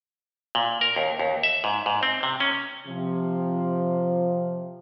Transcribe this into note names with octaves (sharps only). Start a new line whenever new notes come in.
A#2
A#4
D#2
D#2
E5
G#2
G#2
C4
C3
C#4
C3 F3